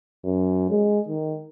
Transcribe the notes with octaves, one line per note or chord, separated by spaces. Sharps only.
F#2
G#3
D#3